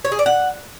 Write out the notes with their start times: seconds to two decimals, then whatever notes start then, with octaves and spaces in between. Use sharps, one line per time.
0.05 C#5
0.12 G#4
0.19 D5
0.26 F#5